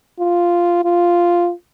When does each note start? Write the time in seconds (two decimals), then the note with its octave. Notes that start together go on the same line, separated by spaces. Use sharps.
0.20 F4
0.84 F4